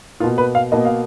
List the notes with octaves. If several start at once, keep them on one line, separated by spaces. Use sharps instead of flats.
B2 A#3 F4
B4
F5
B2 A#3 D#5
F5